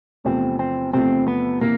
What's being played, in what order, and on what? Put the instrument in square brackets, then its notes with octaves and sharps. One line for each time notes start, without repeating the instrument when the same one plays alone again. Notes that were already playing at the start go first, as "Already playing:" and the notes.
[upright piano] E2 C3 F3 A3 [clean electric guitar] C4
[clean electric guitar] C4
[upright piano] E2 C3 F3 A3 [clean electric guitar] C4
[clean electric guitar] B3
[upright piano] C3 E3 [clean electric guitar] A#3